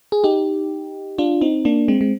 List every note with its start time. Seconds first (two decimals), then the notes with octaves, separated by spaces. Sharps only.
0.12 G#4
0.24 D#4 G4
1.18 D4 F4
1.41 C4 D#4
1.65 A#3 D4
1.88 G#3 C4
2.01 G#3